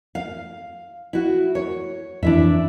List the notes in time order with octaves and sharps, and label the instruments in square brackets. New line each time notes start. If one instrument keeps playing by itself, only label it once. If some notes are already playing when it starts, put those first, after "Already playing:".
[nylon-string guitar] F5
E4 F#4
C#5
[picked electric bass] F2 E3 [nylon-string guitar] D4 E4 E5